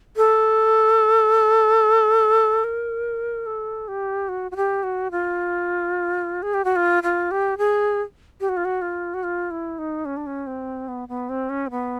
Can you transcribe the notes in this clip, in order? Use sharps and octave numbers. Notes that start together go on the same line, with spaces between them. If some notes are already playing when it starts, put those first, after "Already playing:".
A4
A#4
A4
G4
F#4
F#4
G4
F#4
F4
G#4
G4
F#4
F4
F4
G4
G#4
G4
F#4
F4
F#4
F4
F#4
F4
E4
D#4
C#4
D4
C#4
C4
B3
B3
C4
C#4
C4
B3